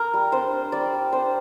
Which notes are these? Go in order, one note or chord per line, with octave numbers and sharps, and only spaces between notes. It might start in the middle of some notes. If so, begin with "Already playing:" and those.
Already playing: A#4
G3
D4 C5
D4
G3 D5
G3
D4 C5